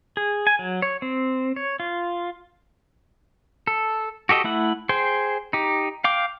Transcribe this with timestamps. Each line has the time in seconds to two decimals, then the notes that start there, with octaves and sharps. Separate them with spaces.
0.17 G#4
0.47 G#5
0.59 F#3
0.82 C#5
1.02 C4
1.56 C#5
1.80 F4
3.67 A4
4.29 F#4 G4 A4 D#5
4.44 A3 E4 F#5
4.89 G#4 C5 G5
5.53 D#4 G4
6.04 F5 G5 D6